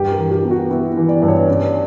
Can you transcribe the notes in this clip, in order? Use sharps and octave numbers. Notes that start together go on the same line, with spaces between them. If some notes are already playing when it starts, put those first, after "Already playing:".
Already playing: G2 G4
A#4
E3
G4
B3
F#4
B3 E4
E3
D5
G2
C#5
C#4 D5